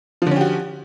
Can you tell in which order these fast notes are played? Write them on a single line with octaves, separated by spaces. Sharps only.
F3 D3 C#4 G4 F#4